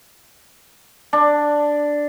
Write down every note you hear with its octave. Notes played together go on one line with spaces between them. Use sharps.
D4